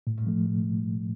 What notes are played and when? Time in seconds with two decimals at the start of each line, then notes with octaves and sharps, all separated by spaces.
0.07 A2
0.27 F3 A3
0.46 A2